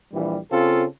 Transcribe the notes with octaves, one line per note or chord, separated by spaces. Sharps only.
A#1 E3 G3
C#3 C4 F4 A4